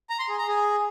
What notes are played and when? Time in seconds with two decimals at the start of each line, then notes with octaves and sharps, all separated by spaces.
0.10 A#5
0.19 C6
0.29 G#4
0.38 A#5
0.48 G#4